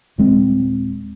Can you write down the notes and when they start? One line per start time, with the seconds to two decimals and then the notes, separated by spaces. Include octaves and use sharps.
0.18 D#1 G#3 C4